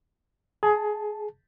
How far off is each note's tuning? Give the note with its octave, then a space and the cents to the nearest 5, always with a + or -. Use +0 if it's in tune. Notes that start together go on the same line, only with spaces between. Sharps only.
G#4 +20 A5 +0